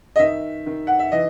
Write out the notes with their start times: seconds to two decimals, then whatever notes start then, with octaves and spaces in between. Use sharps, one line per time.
0.16 D#5
0.19 D#3 E5
0.66 D#3
0.87 F#5
0.99 E5
1.12 E3 D#5